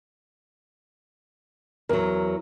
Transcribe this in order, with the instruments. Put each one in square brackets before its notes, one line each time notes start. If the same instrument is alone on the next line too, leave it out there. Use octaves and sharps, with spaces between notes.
[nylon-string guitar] E2 F#3 [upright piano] A#4